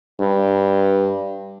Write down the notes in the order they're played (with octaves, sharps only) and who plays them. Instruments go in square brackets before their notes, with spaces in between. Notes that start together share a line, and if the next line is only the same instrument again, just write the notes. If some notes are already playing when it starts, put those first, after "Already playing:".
[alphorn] G2